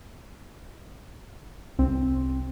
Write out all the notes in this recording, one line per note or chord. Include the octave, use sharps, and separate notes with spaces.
C2 C4